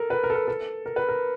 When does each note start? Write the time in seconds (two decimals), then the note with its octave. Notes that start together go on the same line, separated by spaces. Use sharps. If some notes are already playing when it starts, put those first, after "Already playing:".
Already playing: A4 A#4
0.10 B4
0.23 A#4
0.30 A4
0.35 A#4
0.48 A4
0.86 A#4
0.96 B4
1.09 A#4